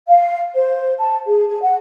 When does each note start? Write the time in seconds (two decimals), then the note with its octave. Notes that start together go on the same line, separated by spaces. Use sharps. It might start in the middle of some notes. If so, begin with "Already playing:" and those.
0.08 F5
0.54 C5
0.99 A5
1.26 G#4
1.48 G#4
1.62 F#5